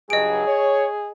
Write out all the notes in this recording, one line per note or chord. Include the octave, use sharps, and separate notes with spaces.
C#2 G2 F#3 G#4 D#5 D7
C#5